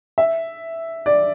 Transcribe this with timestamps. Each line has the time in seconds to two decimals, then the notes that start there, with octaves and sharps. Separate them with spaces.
0.18 E5
1.06 D5